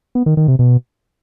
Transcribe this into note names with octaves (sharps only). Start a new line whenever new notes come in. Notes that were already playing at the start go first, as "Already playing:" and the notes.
B3
D#3
D#3
C3
B2